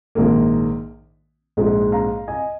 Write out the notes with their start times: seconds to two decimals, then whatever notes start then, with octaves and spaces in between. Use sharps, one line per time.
0.15 A#1 G#2 D#3 A#3
1.57 A#1 G#2 G#3
1.92 F5 A#5
2.28 D#5 G#5